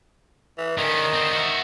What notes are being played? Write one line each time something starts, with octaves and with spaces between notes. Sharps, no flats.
E3
D3 D#3 C#4
D3 C4
F#4 E5